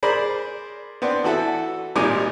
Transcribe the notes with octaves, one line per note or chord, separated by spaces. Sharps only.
G#4 A#4 C5 D5 B5
B3 C4 D4
E3 F#4 A4 E5
G#1 A#2 G3 D#4 G#5 D6